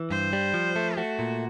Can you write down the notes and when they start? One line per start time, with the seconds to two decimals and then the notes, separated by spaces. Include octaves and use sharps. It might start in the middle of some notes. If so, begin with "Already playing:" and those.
Already playing: E3
0.10 G2 C5
0.33 G3
0.54 F3
0.76 A3
0.97 A3 F#4
1.19 A#2